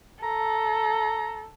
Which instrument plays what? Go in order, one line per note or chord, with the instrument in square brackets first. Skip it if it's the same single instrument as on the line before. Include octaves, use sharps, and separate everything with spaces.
[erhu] A4 [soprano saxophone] A#5